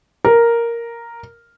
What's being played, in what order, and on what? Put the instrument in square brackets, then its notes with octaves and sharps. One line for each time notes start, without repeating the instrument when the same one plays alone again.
[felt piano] A#4